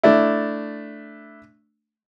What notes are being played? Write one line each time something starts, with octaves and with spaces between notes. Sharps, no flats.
A3 D4 E4